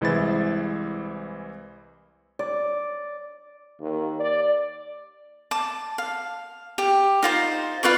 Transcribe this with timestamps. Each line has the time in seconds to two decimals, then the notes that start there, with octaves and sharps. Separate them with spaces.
0.01 C2 E3 G#3 E4 C5 A6
2.39 D5
3.80 D#2
4.19 D5
5.51 A5 D6
5.98 F5
6.78 G4
7.23 D#4 F4 C5
7.83 F4 B4 D5 C#6